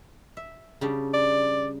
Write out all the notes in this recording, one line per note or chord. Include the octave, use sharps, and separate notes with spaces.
E5
C#3 G3 D4
D5